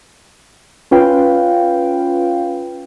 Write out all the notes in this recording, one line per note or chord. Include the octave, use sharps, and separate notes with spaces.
C#4 F4 B4 F5 G5